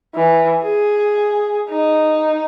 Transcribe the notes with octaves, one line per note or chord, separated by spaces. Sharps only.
E3
G#4
D#4